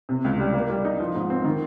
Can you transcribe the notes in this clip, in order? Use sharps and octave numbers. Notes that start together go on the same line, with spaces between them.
C3
C#2
G3
A#3
G3
D#4
F3
G#2
C4
D#3